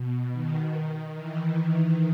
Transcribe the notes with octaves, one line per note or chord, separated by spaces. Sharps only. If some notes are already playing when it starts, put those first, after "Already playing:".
Already playing: B2
D#3
E3